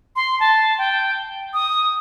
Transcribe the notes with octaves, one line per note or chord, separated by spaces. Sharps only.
C6
A5
G5
D#6